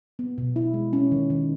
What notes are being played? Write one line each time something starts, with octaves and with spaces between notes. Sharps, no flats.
B3
B2
E4
G#3
C#4
D#3
D#3